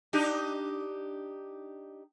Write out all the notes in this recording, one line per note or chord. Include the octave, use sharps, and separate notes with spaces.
D4 D#4 G4